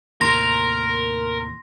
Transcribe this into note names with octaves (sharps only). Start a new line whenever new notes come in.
D#2 A2 C3 A#4 C6 A#6